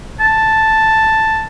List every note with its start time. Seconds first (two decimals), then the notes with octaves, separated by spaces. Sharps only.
0.20 A5